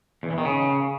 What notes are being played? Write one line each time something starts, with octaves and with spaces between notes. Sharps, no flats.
E2
E3
D#3
C#3